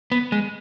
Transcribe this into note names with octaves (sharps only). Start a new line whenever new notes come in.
B3
G#3